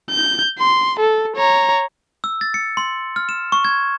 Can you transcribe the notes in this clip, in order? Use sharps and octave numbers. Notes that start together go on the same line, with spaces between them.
G6
C6
A4
C#5 A#5
E6
A6
C#7
C6
F6
E7
C#6
G#6